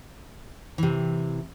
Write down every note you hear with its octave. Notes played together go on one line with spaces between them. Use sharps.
C3 E3